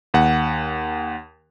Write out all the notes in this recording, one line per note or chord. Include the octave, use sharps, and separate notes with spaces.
D#2 F#5